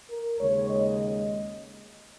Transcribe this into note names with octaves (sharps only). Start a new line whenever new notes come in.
A#4
D#2 C#3 G#3 C#5
D#5